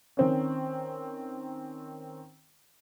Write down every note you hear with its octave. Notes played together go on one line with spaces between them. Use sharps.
D#3 C4 C#4